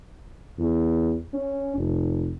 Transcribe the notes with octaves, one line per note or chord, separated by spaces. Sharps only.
E2
C#4
F1